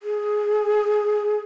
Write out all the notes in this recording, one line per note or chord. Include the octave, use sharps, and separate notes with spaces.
G#4